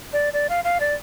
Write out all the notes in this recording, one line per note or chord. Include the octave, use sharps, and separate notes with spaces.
D5
D5
F5
F5
D5